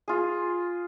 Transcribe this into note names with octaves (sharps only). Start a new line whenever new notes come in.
F4 G#4